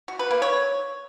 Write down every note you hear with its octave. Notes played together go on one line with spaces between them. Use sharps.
F#4
B4
A#3
C#5